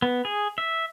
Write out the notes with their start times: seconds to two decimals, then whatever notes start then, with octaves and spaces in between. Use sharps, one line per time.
0.02 B3
0.25 G#4
0.58 E5